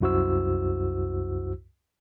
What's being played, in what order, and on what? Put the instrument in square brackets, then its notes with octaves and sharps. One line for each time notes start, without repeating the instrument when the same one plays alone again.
[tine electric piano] C2 F#2 E4 F#4 C5 E6